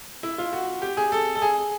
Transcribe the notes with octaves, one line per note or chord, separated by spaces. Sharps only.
E4
F4
F#4
G4
G#4
A4
A4
G#4